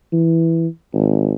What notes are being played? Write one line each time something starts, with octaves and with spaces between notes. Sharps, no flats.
E3
G#1